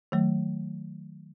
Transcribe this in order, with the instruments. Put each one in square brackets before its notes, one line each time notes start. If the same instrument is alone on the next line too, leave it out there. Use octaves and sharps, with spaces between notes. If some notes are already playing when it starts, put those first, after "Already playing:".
[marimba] D#3 F#3 A3